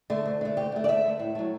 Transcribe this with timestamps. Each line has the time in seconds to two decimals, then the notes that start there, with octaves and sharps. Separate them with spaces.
0.10 D3 A3
0.26 D2
0.41 D3 A3
0.57 D2 G4
0.72 D3 A3
0.84 D5
0.88 D2 E5
1.04 D3 A3
1.19 A2
1.35 F#3 A3